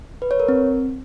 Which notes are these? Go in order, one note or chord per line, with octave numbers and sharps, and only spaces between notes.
B4
C#5
A#4
C4